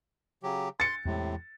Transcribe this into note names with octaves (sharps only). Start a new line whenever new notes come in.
C#3 F#3 G4
C6 A6 C#7
E2 A2 C3 G#3